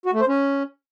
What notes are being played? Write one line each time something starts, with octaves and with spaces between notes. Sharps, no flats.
F#4
A3
C5
C#4